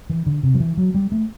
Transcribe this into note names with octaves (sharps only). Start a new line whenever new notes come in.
E3
D3
C3
F#3
E3
F#3
G3
A3